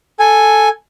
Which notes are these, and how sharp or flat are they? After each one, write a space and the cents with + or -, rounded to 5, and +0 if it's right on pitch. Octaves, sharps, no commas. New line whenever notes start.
A4 +0 G#5 +0